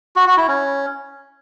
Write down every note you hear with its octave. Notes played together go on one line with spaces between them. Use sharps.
F#4
F#4
E4
C#4